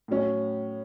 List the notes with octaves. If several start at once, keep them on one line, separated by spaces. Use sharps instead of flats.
A2 F#3 C#4